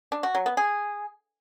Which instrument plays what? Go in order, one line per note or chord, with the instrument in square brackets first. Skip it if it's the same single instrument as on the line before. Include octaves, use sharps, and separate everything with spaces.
[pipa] D4
F#4
F#3
B3
G#4